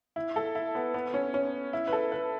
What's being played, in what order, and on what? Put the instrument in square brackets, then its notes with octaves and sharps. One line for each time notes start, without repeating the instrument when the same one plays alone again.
[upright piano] E4
A4
E4
B3
B3
C#4
C#4
E4
B4
A4
B4